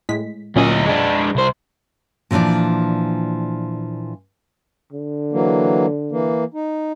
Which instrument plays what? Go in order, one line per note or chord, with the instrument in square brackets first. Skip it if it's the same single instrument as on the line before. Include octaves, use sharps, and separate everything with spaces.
[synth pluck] A2 G#3 B6
[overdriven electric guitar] D2 D#5 [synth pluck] A#2 F#3 C#4
[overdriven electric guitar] G#3 D4
C2 C5
[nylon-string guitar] A#2 E3 F3 D4 D5
[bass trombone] D3
[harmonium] E3 F#3 A#3
E3 A#3
D#4